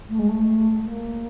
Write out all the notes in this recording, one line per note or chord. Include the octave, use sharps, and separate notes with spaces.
A3
G#3
A3
A#3